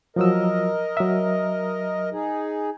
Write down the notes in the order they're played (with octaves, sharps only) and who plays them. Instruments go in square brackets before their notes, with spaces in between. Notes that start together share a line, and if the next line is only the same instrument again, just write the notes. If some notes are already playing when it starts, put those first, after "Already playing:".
[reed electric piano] F3 F#3 E6 [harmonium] A#4 D#5
[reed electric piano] F#3 E5
[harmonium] D#4 G#4